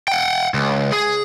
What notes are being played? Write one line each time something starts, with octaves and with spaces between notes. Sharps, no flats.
F#5 G5
C#2
G#4